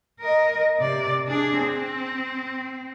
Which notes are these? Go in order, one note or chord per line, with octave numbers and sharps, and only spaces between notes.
A#4 D#5
C3 D5
D4 G#4
C4